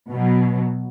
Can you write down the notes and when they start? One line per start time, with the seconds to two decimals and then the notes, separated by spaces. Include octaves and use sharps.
0.11 B2 F#3